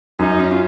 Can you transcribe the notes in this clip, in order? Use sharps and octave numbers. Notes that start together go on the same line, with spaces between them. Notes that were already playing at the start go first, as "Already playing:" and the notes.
F#2 D#4
C#4
F4